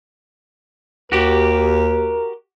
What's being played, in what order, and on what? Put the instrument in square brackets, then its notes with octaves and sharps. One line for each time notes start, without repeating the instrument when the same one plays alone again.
[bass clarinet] D#2 [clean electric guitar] F#4 G4 [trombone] A#4